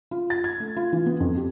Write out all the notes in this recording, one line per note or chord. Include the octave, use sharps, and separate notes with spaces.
F4
A6
G#6
A3
F4
E3
B3
F2
G4